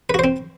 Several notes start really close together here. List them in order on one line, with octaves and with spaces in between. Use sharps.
B4 F#4 C5 C4